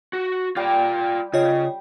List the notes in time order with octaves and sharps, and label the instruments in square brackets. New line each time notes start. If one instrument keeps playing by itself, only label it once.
[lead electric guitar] F#4
[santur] G3 G4 G5 [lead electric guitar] F4 D5
[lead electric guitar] C#3 [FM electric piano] F4 C#5 D#5